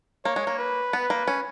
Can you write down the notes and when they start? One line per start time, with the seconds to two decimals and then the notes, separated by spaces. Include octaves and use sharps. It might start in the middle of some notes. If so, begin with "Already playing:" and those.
0.25 A#3 C#5
0.36 G#3
0.47 A#3
0.59 B4
0.93 B3
1.10 A#3
1.28 C#4